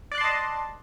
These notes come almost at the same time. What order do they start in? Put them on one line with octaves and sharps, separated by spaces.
D5 F#6 C6 A5 D#5